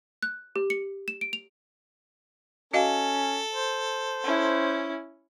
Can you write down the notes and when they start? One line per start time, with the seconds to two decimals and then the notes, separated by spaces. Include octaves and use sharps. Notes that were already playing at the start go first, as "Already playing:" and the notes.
0.23 F#6
0.56 G4
0.70 C#7
1.08 E7
1.21 D7
1.33 F7
2.74 C#4 F#4 A4 D#5 F5
3.52 C5
4.24 C#4 E4